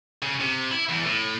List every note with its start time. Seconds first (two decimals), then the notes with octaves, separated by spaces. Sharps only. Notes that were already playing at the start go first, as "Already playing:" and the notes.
0.22 C#3
0.40 C3
0.71 E4
0.90 E2
1.06 A2